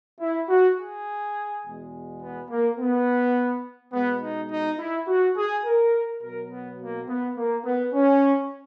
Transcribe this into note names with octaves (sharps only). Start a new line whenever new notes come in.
E4
F#4
G#4
E2 B2 G#3
B3
A#3
B3
B2 G#3 B3
D#4
D#4
E4
F#4
G#4
A#4
B2 F#3 A#4
B3
A#3
B3
A#3
B3
C#4